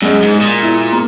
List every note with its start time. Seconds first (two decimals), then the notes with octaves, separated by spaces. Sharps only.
0.02 F#2 G#3
0.22 G#2
0.32 G#4
0.41 A#2
0.62 E4
0.92 A#3